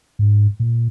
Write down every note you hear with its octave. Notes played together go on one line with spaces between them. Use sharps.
G#2
A#2